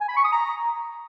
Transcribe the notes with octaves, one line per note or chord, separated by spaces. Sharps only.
G#5
B5
C#6
D#6
A#5